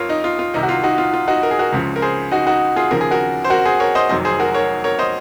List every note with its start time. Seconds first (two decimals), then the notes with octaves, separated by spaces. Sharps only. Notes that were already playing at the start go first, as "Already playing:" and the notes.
Already playing: F2 F4 A#4 C#5
0.09 D#4
0.24 F4
0.39 F4
0.54 C2 C3 D#3 D#4
0.63 F#4
0.69 F4
0.84 D#4 F#4
0.98 F4
1.14 F4
1.28 D#4 F#4
1.43 A#4
1.51 G#4
1.59 F#4 A#4
1.72 C#2 C#3 F3
1.96 A#4
2.02 G#4 C5
2.31 D#4 F#4
2.47 D#4 F#4
2.76 F4 G#4
2.91 D#2 C#3 F3 A#4
3.01 G#4
3.11 F#4 A#4
3.44 C5
3.50 F#4 A#4
3.65 G#4 C5
3.80 A#4 C#5
3.95 C5 D#5
4.09 F1 F2 D#3 F#3 C5 D#5
4.25 G#4 C5
4.40 F#4 A#4
4.54 A#4 C#5
4.84 A#4 C#5
4.99 C5 D#5